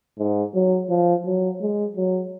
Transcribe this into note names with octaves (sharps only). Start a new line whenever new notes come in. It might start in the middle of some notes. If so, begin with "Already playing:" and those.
G#2
F#3
F3
F#3
G#3
F#3